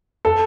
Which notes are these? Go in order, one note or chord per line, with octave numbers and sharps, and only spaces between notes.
A4